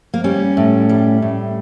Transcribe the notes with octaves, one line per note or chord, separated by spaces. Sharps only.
A#3
G3 C#4
A2
G3
A2